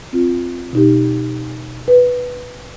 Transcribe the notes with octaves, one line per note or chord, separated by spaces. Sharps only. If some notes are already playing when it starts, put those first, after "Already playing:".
C4 F4
B2 D#4 G4
B4